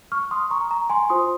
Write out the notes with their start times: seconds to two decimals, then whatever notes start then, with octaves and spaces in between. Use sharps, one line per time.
0.12 C#6 F6
0.31 C6 D#6
0.51 A#5 C#6
0.70 A#5 C#6
0.90 G#5 C6
1.09 F4 C5 C6 D#6